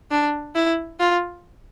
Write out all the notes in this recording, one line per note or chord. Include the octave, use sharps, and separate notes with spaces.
D4
E4
F4